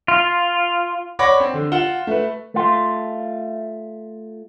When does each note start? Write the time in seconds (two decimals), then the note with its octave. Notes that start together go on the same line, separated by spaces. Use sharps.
0.08 F4
1.19 C#5 D5 F#5 B5 D6 A#6
1.40 C4
1.54 D3
1.72 F4 F#5 E7 G7
2.07 A3 B4
2.54 A3 F4